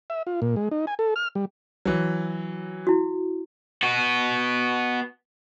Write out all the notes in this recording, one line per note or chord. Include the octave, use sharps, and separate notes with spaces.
E5
F4
A#2
G#3
D#4
G#5
A4
F6
G3
E3 F#3
E4 F#4
B3 F#4